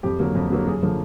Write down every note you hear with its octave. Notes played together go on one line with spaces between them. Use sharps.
F2 G4
D3 F#3 A#3
F2
D3 F#3 A#3
F#2 G#4
D3 F3 A#3